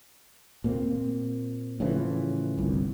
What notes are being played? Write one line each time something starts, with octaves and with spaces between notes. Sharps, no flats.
A#2 A#3 C4
A2 C#3 E3 F3
G1 C2